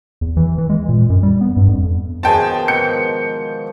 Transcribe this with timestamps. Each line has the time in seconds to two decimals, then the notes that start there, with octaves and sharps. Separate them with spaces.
0.21 E2
0.37 E3
0.58 E3
0.69 G#3
0.89 A#2
1.10 F#2
1.23 G3
1.41 B3
1.57 G2
1.68 F2
2.23 B2 D#3 F3 G#4 G5 A5
2.68 G#2 G6 C#7